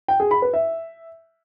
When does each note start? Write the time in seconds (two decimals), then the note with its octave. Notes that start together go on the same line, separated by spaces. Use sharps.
0.08 G5
0.20 G#4
0.31 B5
0.42 B4
0.54 E5